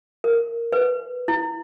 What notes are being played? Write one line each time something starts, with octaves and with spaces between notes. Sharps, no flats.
A#4
B4
E4